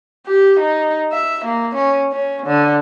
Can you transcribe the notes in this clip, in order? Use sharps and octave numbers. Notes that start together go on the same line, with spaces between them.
G4
D#4
E5
A#3
C#4
C#4
D3